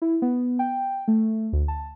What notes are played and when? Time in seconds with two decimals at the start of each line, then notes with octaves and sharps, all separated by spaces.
0.02 E4
0.22 B3
0.59 G5
1.08 A3
1.53 D2
1.68 A5